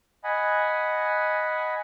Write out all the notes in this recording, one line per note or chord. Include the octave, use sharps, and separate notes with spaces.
D#5 F#5 G#5 B5